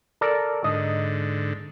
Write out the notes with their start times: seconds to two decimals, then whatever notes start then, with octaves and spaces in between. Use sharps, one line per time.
0.21 A4 A#4 D5
0.64 G#2 D3 D#5